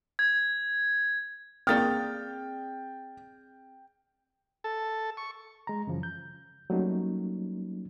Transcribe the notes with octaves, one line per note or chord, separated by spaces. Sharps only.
G#6
A#3 C4 G#4 D5 G5 D#6 F6 A6
A4
C#6
G#3 A#5
F#2 C#3 E3 F3
G6
F#3 G3 A3 A#3 C#4 D#4